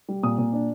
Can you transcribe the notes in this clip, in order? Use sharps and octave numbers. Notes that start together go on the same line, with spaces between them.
G3
A#2 D#6
A#2
D4